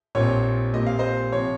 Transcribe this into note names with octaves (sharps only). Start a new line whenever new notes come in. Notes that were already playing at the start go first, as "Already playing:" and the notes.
A#1 A#2 G3 C4 F4 C#5
A#2 G3 C4 D#5
F5
C5 D#5
C3 F3 C4 C#5